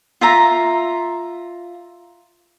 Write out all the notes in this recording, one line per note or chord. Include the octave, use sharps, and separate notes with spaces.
F4 E5 A#5